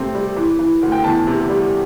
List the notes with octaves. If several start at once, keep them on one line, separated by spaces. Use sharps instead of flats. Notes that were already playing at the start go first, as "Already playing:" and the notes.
Already playing: C3 A3 C4
G3
E3
E3
D2
G5
E2 A5
C3
G3